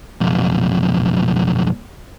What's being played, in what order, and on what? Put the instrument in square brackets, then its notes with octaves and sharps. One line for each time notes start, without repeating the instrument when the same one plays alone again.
[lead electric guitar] B1 F2